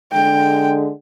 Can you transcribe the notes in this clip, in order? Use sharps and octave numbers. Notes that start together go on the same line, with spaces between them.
D3 G#3 G5